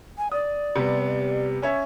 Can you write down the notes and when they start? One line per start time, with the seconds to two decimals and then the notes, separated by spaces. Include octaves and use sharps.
0.18 G#5
0.32 D5 D#6
0.76 C3 G3 B3
1.62 C#4 C#5 E5